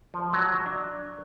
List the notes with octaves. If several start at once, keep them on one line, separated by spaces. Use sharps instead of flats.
F3
F#3
D4